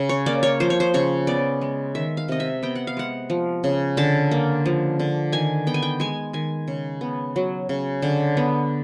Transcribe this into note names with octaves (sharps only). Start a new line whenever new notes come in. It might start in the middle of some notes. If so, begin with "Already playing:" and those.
Already playing: C#3
C#5
A#3 D5
C#5
F3 C5
C#5
C5
C#3 C#5
B3 D5
G#3
D#3 E5
F5
C3 D#5
E5
B3 G5
F#5
F5
G#3 F#5
F3
C#3
D3 A5
A#3
F3
D3
D#3 G#5
B3 G5
G#5
G5
G#3 G#5
D#3 G#5
C#3
B3
F#3
C#3
D3
B3